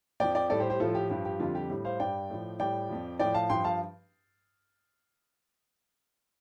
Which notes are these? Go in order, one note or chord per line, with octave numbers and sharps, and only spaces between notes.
F2 F3 D5 G5
D5 G5
A2 G3 A4 D5
G4 C5
G4 C5
A2 F3 F4 A4
G4
G2 F3 G4
G4
F2 D3 G3 F4
G4
A2 G3
C5 F5
G2 G3 D5 G5
A2 F3
A2 G3 D5 G5
F2 F3
A2 F3 D5 G5
F5 A5
G2 F3 G5 C6
F5 A5